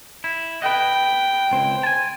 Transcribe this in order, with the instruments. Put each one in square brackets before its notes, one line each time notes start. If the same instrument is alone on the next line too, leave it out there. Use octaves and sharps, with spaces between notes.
[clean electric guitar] E4
[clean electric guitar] B4 D#5 [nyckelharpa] G5
[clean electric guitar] C#2 C4
G#5 A5